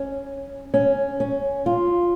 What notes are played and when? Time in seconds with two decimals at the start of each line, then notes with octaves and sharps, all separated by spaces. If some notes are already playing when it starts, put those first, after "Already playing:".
Already playing: C#4
0.74 C#4
1.20 C#4
1.66 F4